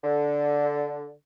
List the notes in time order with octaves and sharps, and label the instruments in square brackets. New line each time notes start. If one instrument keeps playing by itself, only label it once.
[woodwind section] D3